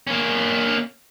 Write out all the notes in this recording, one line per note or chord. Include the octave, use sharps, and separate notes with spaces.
A#3 C#4